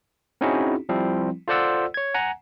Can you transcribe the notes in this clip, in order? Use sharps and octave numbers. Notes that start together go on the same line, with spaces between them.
C4 C#4 D#4 E4 F#4 G#4
F3 G3 C4 E4
F4 A4 C5 D5 F#5 E6
C#5 G#6
F#5 G#5 A#5